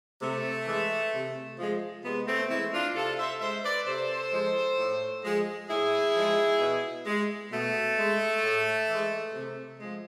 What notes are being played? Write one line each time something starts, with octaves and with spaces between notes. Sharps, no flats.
C3 A3
E3 G#3
C3
F3 G#3
C3 G#3 B3
A3 C4
E3 G#3 C4 E4
D4 F4
C3 F4 A4
C5 E5
G#3 C5 E5
B4 D5
C3 A4 C5
F3 G#3
A2
F3 G#3
A2 E4 G#4
F3 G#3
B2
G#3
B2 A3
G#3
A2
E3 G#3
C3
F3 G#3